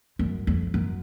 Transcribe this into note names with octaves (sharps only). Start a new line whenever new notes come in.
F#2
F2
F#2